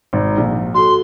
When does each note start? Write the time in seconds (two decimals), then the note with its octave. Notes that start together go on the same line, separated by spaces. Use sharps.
0.13 G#1
0.37 A#1
0.75 F#4 A4 C6